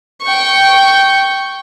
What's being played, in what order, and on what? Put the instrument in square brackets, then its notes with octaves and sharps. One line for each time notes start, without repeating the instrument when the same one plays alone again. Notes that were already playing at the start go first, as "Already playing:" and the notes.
[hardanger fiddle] G5 C#6